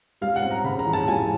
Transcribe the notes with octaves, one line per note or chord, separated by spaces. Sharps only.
G3 F5
F#5
C4
A#5
C#3 B5
A#5
E3
A5
G3 G#5